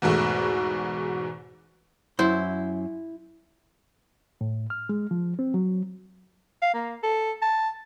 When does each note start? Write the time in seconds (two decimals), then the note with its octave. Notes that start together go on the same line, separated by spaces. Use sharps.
0.02 E2 G#2 B2 A3
2.19 F#2 E4 C5
4.41 A2
4.70 F6
4.89 G#3
5.11 F3
5.39 C4
5.54 F#3
6.62 F5
6.74 A#3
7.03 A4
7.42 A5